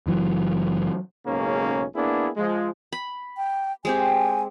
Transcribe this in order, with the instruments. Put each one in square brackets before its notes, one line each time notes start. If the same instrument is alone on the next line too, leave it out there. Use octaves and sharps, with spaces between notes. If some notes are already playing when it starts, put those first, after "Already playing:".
[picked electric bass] F#1 E3 F#3
[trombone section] B1 G#2 C#3 A#3 C#4
A#3 B3 D4 E4 G#4
F3 G#3
[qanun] B5
[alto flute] G5
[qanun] G#3 C4 G4 [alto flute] G#5